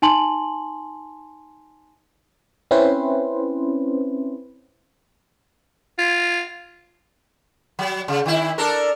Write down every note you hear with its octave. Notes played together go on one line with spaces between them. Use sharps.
D#4 G#5 A5 C6 F#7
C4 C#4 E4 B4 C5
F4
F#3
C#3
D#3 E4
D4 A4 A#4